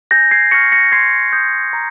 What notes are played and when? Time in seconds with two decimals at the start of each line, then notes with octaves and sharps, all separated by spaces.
0.11 G#5 G6 A#6
0.31 G#6 C7
0.51 C#6 F6 A#6 C#7
0.72 A#6 C#7
0.92 C6 G#6 C7
1.33 D#6 G6
1.73 A#5